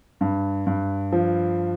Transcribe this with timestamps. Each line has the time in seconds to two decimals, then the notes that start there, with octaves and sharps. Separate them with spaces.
0.21 G2
0.67 G2
1.12 F3